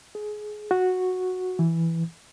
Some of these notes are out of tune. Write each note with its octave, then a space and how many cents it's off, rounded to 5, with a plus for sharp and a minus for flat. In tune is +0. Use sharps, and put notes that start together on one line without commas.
G#4 +20
F#4 -5
E3 +5